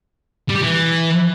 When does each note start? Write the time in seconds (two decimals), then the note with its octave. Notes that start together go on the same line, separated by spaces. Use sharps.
0.49 G3
0.56 G4
0.62 E3